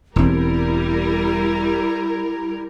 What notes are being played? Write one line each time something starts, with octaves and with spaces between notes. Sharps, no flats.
E1 G3 C4 E4 A#4